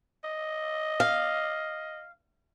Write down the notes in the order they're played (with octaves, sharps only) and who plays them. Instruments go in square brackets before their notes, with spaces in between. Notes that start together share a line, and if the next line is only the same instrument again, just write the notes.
[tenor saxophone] D#5
[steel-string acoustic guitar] F5